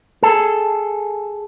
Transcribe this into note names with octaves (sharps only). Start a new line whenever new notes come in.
G#4 A4